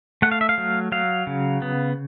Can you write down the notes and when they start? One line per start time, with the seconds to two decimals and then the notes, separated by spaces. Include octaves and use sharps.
0.22 A3 F#5
0.31 F5
0.41 E5
0.49 F5
0.58 F#3
0.92 F#3 F5
1.27 C#3
1.62 B3